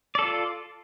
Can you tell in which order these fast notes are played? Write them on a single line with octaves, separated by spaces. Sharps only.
D5 A4 F4